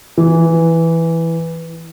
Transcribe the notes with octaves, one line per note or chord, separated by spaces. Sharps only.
E3